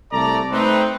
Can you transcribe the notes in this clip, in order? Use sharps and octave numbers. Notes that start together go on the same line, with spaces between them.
C2 A3 A4 D5 A#5
A3 C4 D#4 B4